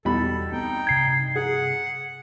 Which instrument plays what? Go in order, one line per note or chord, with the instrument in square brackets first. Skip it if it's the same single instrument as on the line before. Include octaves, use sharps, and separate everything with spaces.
[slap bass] E2 [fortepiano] B2 G3 B5 [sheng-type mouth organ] A4
[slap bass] B3 C4 [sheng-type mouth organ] D#4 G5
[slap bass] G2 C3 [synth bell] G#6 C7
[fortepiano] G#4 [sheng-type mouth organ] F#5